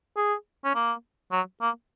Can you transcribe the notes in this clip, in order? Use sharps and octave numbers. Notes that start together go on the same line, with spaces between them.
G#4
C#4
A#3
F#3
A#3